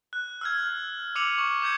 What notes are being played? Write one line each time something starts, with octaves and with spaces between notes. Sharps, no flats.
F#6
E6 F6 G#6
D6 E6 C#7 D#7 F7 F#7
C#6
D6 G6 G#6 C#7